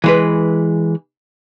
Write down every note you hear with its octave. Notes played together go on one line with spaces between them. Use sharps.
E3 G#3 B4